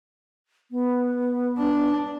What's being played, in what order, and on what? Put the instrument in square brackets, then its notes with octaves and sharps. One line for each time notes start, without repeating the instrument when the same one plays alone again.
[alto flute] B3
[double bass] D4